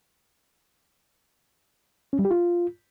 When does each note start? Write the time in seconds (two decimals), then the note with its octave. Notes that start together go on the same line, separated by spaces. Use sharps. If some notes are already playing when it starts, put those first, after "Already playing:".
2.13 C#4
2.19 G3
2.25 G4
2.31 F4